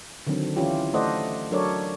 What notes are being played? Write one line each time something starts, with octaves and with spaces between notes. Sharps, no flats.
D3 D#3 F#3 C4 D4
E3 C#4 E4 F4 G4
A3 A4 C5 D5 D#5 F#5
F#3 D4 A4 A#4 C#5 D5